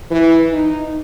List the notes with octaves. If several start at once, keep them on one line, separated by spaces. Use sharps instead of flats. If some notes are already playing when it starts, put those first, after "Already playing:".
E3
D#4